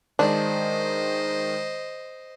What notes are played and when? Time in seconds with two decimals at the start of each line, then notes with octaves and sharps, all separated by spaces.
0.19 D#3 G#3 D4 C5 D#5